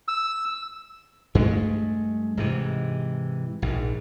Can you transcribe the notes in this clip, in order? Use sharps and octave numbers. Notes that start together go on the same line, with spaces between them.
E6
G2 G#3 A3
G#2 C3 E3
A#1 G#2